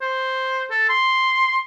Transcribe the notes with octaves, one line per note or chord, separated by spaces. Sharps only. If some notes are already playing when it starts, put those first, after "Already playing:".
C5
A4
C6